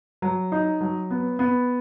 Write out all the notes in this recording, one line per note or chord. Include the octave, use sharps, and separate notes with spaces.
F#3
D#4
F#3
B3
B3